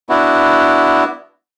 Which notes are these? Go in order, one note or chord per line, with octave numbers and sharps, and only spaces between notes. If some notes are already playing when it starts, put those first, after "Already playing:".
B3 D4 E4 F#4